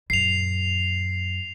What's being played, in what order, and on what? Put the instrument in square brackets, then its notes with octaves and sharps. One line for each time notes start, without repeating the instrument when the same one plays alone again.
[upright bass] F#2 A#2 [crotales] C7 F7